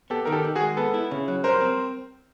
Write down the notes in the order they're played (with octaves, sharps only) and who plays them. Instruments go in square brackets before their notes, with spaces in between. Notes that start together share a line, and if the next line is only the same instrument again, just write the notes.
[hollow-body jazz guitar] B3 [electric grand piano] G4 A4
[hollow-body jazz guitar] D#3 [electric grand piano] A#4
[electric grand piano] G4 A4
[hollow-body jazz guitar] D#3
[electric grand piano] F#4 G#4
[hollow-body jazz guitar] G#3
[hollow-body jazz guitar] B3 [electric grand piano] A4 B4
[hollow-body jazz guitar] E4
C#3
F#3
[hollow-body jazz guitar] G3 [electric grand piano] A#4 C5
[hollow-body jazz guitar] C4